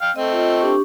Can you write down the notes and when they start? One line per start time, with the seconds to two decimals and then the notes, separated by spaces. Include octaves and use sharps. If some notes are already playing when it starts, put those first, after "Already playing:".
0.02 F5 G5
0.16 A3 C4 D#5
0.33 F4 D#5
0.61 D4 G4 C#6